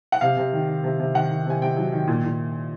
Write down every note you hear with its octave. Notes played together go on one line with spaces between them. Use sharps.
F#5
C3 F5
C3
D#3
D#3
C3
C3
D#3 F#5
D#3
C3 G#5
C3 G5
F#3
D#3
A#2
A#2